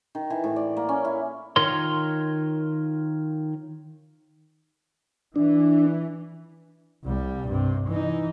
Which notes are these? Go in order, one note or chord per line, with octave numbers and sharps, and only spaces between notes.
D#3
E3
A2
D5
A#3
C#4
E4
D#3 F4 A#4 C#5 C6
E3 D4
C2 G3
G2 C3
E3 D#4